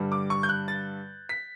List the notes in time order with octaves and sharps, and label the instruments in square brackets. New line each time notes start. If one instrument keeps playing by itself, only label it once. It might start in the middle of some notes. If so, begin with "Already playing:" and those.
Already playing: [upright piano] G2 D3 G3
D6
C#6
G6
F#6
A6
B6